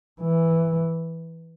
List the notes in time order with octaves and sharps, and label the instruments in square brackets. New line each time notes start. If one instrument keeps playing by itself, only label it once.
[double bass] E3